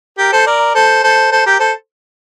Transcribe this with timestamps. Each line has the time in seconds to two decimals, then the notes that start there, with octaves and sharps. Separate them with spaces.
0.18 G4 A#4
0.32 A4 C5
0.46 A#4 D5
0.75 A4 C5
1.03 A4 C5
1.32 A4 C5
1.46 G4 A#4
1.60 A4 C5